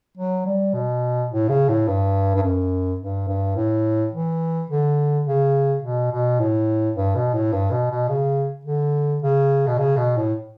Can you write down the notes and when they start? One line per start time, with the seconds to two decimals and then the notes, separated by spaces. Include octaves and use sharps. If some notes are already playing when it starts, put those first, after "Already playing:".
0.17 F#3
0.46 G3
0.73 B2
1.30 A2
1.49 C#3
1.68 A2
1.87 G2
2.35 G2
2.43 F#2
3.00 G2
3.28 G2
3.56 A2
4.13 E3
4.69 D3
5.26 C#3
5.82 B2
6.12 B2
6.39 A2
6.96 G2
7.15 B2
7.33 A2
7.53 G2
7.71 B2
7.91 B2
8.08 C#3
8.65 D3
9.22 C#3
9.67 B2
9.78 C#3
9.97 B2
10.17 A2